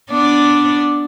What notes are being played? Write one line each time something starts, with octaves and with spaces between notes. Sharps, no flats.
B3 D4 D5